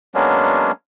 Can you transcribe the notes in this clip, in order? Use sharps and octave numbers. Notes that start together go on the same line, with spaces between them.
F#3 G#3 A#3 B3 C#4 D4